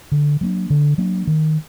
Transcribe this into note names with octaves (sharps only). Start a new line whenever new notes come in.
D3
F#3 A#3 D4
D3
F#3 A#3 D4
D#3